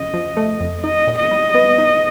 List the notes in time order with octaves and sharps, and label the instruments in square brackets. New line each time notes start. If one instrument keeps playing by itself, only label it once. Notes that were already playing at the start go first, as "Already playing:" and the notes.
Already playing: [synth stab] F2 C#3 [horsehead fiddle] D#5
[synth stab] F3
A3
F2
[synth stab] D#4 [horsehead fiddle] D#5
[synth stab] A#2
[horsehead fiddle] D#5
[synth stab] G3
B3
D#4